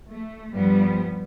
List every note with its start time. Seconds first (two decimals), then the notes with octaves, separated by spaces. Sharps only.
0.10 A3
0.54 G2 F3 G3 B3